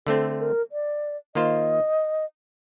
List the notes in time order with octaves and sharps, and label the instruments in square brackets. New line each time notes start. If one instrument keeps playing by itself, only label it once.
[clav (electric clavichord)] D3 A3 C4 [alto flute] A4
[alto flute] A#4
D5
[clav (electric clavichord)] D#3 A#3 F4 C5 [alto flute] D#5